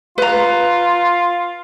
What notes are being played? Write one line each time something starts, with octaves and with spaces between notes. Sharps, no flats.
F4 B4 A#5